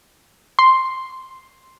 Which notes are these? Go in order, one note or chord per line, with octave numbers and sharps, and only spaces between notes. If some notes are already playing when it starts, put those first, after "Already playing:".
C6